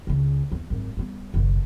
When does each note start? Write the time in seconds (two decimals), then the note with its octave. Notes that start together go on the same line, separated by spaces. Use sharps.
0.07 C#2 C#3
0.52 E2
0.70 G#1 F#2
0.97 G3 B3
1.34 F#1 B1